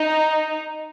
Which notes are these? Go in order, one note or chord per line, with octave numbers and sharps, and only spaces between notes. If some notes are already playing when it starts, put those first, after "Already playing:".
Already playing: D#4